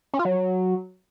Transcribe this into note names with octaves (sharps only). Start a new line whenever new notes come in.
C#4
F4
F#3